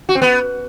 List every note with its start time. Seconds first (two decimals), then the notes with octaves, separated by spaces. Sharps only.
0.09 F#4
0.15 C4
0.22 B3